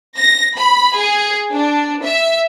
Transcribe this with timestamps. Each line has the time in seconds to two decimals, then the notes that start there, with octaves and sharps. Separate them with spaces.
0.19 A#6
0.58 B5
0.98 G#4
1.54 D4
2.03 E5